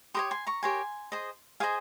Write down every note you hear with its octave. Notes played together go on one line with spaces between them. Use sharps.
G4 A#4 C#5 C6 D#6
G#5 C6
A#5 C#6
G4 A#4 C#5 G#5 C6
G#4 C5 D#5
G#4 C5 D#5 F5 G#5